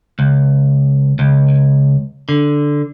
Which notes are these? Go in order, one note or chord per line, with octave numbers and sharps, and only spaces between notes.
C#2
C#2
D3